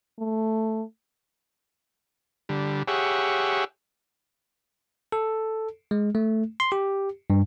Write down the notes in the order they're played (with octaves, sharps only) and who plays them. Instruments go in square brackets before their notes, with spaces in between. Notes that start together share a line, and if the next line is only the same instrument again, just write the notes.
[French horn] A3
[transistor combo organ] D3 G3
G4 G#4 C#5 E5 F#5
[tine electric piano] A4
G#3
A3
C6
G4
G2